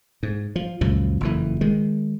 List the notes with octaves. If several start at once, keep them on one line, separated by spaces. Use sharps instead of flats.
G#2
F3
C#2 F#2 A#2 F3
F#1 F2 E3
D#3 G#3